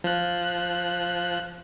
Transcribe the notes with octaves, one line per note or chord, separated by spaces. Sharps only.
F3 F#6